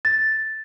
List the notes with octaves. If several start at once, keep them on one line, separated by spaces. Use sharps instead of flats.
A6